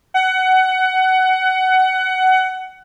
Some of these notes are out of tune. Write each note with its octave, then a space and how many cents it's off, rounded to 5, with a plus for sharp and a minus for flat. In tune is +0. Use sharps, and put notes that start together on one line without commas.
F#5 +20